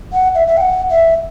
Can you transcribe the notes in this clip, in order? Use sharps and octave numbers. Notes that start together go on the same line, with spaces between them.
F#5
E5
E5
G5
F#5
E5